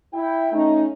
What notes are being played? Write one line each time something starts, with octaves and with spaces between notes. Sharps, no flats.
E4 G5
A3 C#4 D#4